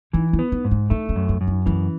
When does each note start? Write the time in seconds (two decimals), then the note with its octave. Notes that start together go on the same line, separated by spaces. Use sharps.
0.13 E3 D#4
0.33 E4
0.39 B3
0.52 D#4
0.65 G#2
0.71 D#4
0.90 A3 D#4
1.09 C#4
1.16 F#2
1.29 B3
1.41 F#2
1.47 D#4
1.66 E3 C#4